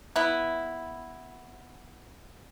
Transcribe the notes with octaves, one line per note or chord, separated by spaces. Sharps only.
B3 E4